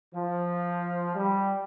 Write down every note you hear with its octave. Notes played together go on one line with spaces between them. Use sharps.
F3
G3